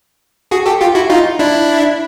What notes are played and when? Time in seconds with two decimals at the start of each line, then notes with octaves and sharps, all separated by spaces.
0.51 F#4 G#4
0.66 G4 A4
0.81 F4 G4
0.95 E4 F#4
1.10 D#4 F4
1.39 D4 E4